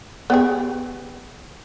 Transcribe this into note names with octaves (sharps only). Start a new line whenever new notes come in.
B3 G4 G#4